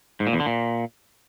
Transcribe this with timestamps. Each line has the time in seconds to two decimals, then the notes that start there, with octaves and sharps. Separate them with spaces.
0.20 G#2
0.27 A#2
0.33 E2
0.40 D3
0.46 A#2